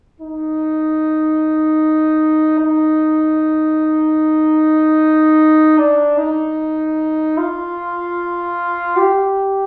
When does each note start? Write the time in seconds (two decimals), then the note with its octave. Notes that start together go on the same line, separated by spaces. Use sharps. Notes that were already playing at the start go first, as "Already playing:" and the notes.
0.20 D#4
2.59 D#4
5.78 D4
6.18 D#4
7.38 F4
8.97 G4